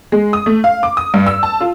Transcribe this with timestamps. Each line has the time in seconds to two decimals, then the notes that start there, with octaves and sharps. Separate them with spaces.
0.12 G#3
0.33 D#6
0.46 A3
0.64 F5
0.83 D6
0.97 D#6
1.14 G2
1.27 E6
1.43 A5
1.61 F4